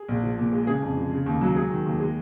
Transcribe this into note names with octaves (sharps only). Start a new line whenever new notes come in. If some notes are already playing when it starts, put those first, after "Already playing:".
Already playing: G#4
A#1
F3
A#2
G#3
C#3 G#4
F2
F3
C#3
D#2
F#3
G#3 G#4
D#3
D#2
G#3